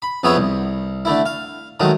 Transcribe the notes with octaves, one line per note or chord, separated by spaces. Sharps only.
B5
F2 B3 G#4 C#5 E5 B5
C2
D3 A3 E4
F5
D#3 F#3 G#3 A3